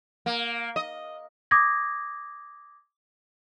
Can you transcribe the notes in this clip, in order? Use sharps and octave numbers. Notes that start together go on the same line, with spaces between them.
A#3
D#5
D6 D#6 G#6 A#6